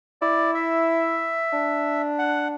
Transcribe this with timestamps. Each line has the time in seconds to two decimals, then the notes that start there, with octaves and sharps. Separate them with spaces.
0.22 E4 D5
0.55 E5
1.53 D4
2.19 F#5